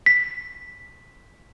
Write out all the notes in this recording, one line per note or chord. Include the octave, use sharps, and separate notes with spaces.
B6